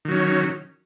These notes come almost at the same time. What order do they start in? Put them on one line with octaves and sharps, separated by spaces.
D#3 F#3 C#4